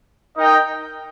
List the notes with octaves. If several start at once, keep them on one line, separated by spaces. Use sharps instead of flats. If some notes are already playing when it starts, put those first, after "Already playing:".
D#4 A#4 D#5 G5